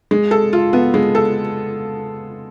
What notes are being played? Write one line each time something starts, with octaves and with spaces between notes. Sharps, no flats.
G#3
A4
F4
B3
G#3
A4